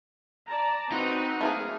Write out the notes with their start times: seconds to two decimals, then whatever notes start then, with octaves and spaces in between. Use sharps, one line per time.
0.48 D5 A5 A#5
0.92 C4 D#4 F#4 B4
1.41 A3 A#3 G#4